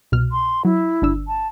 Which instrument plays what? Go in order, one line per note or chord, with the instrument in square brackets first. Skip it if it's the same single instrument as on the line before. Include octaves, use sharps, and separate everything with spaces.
[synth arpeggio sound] C2 B2 F6
[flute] C6
[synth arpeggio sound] F#3 [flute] E4
[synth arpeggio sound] G1 D4 E6
[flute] A5